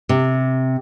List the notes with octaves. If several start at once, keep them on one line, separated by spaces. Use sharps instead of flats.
C3